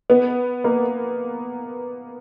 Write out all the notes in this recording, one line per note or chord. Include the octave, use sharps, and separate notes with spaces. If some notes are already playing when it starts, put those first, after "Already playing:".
B3
A#3